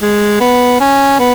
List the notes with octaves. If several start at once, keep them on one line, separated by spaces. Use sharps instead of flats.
G#3
B3
C#4
B3